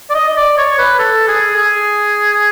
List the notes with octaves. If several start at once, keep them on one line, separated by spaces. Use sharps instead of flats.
D5
D#5
D#5
D5
C#5
B4
A4
G#4
G#4